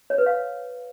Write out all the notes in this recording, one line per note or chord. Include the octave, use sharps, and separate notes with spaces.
C#5
B4
F5